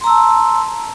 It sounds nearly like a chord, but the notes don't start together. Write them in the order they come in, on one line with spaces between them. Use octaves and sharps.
C6 A#5 E6 A5